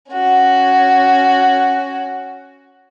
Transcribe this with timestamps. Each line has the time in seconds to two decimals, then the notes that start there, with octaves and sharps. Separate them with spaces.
0.12 C#4 F#4